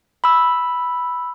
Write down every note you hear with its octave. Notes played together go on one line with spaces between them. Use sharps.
B5 E6